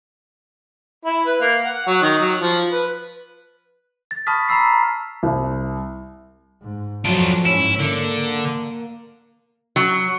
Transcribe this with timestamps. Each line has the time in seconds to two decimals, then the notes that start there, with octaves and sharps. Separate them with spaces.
1.05 E4
1.26 B4
1.40 A#3
1.64 F#5
1.87 F#3
2.02 D#3
2.20 F#3
2.40 F3
2.71 B4
4.11 A6
4.27 A5 B5 C#6 D#6 F6 B6
4.48 A#5 B5 E6 C7
5.23 C2
6.62 G#2
7.05 F2 F#3 D4 F4
7.45 G#2 C#4 E4
7.80 D3 A#3
9.76 F#3